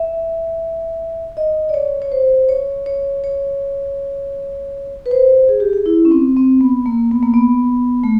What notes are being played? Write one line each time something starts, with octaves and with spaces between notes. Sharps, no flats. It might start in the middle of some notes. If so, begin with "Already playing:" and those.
Already playing: E5
D#5
D5
C#5
C#5
C5
C#5
C#5
C#5
B4
C5
G#4
G4
G#4
E4
C#4
C4
C4
B3
A#3
B3
A#3
B3
A3